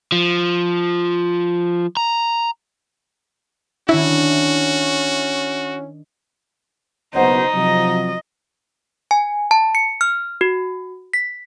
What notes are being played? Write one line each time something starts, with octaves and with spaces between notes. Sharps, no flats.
F3
A#5
D#3 C#4 D4 E4 F#4
F#1 B2 D#4 C5 F#5
C3 F3 F#3 D#5
G#5
A5
C#7
F6
F#4
B6